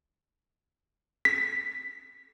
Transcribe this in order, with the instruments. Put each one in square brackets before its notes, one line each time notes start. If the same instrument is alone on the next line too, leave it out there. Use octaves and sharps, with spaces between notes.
[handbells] B6